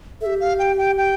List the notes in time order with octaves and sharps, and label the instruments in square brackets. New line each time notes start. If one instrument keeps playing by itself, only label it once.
[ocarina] G4 A4 [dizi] E5
[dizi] F5
G5
G5
G5